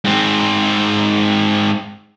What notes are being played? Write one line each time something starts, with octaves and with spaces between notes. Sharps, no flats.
G#2 C4